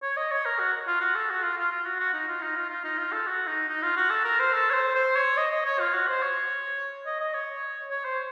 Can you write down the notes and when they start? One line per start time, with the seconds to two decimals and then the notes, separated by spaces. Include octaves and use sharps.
0.02 C#5
0.17 D#5
0.31 C#5
0.45 A#4
0.59 F#4
0.87 F4
1.01 F#4
1.15 A4
1.30 F#4
1.43 F4
1.58 F4
1.72 F4
1.86 F#4
2.00 F#4
2.14 D#4
2.28 F4
2.42 D#4
2.56 F4
2.70 F4
2.84 D#4
2.98 F4
3.12 A4
3.27 F#4
3.47 D#4
3.69 D#4
3.83 F4
3.96 F#4
4.10 A4
4.24 A#4
4.39 C5
4.53 A4
4.70 C#5
4.74 C5
4.95 C5
5.16 C#5
5.37 D#5
5.51 D#5
5.66 C#5
5.80 F4
5.94 F#4
6.08 C5
6.22 C#5
7.06 D#5
7.20 D#5
7.34 C#5
7.90 C#5
8.05 C5